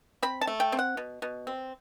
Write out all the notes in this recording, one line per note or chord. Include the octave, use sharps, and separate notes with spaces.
C4 B5
A5
A3
G5
C4
F#5
B2
B2
C4